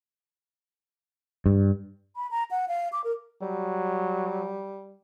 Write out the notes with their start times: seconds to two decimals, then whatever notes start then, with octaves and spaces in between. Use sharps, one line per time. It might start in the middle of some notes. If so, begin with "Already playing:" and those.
1.46 G2
2.16 B5
2.31 A#5
2.51 F#5
2.68 F5
2.93 D6
3.04 A#4
3.42 F#3 G3